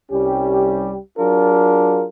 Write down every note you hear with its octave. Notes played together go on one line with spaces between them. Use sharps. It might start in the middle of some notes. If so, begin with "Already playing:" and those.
C2 G3 C#4 G4
F#3 D4 F4 G#4 A#4